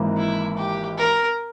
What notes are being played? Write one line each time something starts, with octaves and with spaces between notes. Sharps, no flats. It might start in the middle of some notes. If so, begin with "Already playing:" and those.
Already playing: G#1 G#2 E3 A#3
E4
G4
A#4